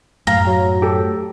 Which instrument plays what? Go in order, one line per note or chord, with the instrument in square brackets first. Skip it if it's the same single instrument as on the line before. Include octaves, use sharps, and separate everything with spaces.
[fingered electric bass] F#2 A2 [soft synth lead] F5 [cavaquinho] A#5
[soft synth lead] F#3
[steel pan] G4 A4